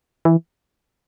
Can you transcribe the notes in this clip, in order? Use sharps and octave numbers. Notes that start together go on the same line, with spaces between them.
E3